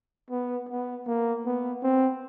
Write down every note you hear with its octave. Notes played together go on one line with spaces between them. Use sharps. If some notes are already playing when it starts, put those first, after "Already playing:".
B3
B3
A#3
B3
C4